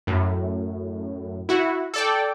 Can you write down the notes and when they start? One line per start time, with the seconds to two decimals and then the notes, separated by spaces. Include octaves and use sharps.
0.07 F#2 A2
1.49 E4 F#4
1.94 A4 D5 G5